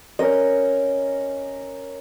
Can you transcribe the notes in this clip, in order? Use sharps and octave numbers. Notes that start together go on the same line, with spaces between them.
C#4 A#4 D#5